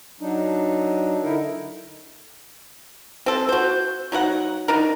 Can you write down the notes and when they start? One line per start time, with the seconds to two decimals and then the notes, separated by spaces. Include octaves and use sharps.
0.21 F#3 D4 D#4
1.23 D3 D#4 E4 A#4
3.26 C4 A4
3.49 F#4 C5
4.12 F#3 D#4 A#4 F#5
4.68 D4 D#4 A#4